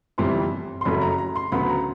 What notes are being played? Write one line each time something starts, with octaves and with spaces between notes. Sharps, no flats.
G1 F2 C3 E3 G3 C6
C6
F#1 F2 C#3 F#3 A3 B5
A#5
A#5
C6
D2 C#3 F#3 B3 B5
A#5